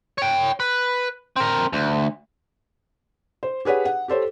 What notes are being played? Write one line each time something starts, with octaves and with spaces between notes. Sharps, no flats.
C#5 G5
B4
C4 A#4
D2
C5
G4 G#4 B4 C#5 F#5
F#5
G4 A4 C5 C#5